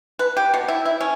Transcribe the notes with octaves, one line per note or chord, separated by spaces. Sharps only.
B4
G4
B2
E4
E4
C#4